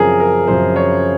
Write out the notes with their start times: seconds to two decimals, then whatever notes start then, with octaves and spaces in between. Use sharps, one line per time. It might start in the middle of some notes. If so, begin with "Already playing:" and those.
Already playing: F#2 C#3 F3 C4 G#4 A#4
0.20 A#4
0.47 F#2 C#3 F3 C4 C5
0.76 C#5